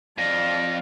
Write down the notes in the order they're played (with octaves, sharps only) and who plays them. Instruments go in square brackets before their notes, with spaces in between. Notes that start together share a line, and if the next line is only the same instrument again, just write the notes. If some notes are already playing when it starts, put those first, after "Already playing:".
[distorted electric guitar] F2 [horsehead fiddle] D5 F5 [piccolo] A#6